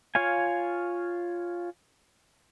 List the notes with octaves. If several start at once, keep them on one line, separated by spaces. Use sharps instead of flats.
F4 C#5 F5 G#5